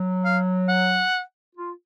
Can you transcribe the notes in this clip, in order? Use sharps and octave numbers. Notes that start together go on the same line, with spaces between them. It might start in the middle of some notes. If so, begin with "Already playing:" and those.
Already playing: F#3
F5
F#5
F4